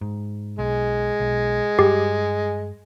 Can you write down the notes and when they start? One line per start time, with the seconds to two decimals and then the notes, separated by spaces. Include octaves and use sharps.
0.01 G#2
0.59 B1 G#3
1.20 B1
1.79 G2 G3 G4